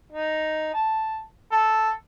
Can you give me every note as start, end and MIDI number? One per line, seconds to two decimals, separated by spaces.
0.12 0.74 63
0.74 1.21 81
1.52 1.91 69